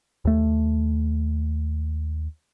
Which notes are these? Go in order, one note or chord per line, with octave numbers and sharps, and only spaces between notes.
D#2 A3